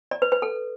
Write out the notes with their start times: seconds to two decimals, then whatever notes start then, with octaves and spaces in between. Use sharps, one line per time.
0.11 D5
0.22 B4
0.32 B4
0.42 A4